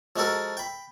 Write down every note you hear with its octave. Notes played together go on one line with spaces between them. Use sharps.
F3 G#3 F#4 A4 A#4
G5 B5